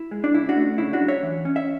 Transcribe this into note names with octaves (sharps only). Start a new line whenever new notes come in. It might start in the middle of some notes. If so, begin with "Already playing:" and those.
Already playing: E4
G#3
D4
C#3 E4
D4 F#4
A3
C#3 E4
D4 F#4
F#3
C#5 E5
E3
C#4
E5